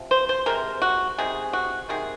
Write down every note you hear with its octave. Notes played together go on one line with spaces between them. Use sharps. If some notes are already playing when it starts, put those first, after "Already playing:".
Already playing: C3 F3
C5
C5
C3 F3 G#3 A#4
F#4
C3 D#3 G#3 G#4
F#4
C3 D#3 G#3 G#4